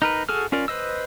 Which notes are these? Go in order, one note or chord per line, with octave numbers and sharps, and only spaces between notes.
D#4 A#4 B4
F#4 G#4 A4 F6
C#4 F4 A#4 D5
B4 C5 D#5 E6